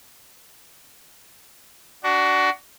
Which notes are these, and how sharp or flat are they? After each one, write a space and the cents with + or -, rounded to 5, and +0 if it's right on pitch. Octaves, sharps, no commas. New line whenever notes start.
D4 +0 F#4 +20